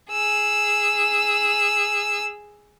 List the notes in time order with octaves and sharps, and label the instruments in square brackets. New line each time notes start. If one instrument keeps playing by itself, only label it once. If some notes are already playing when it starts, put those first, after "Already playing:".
[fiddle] G#4 E6